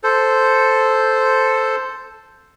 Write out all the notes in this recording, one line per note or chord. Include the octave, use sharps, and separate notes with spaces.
A4 C5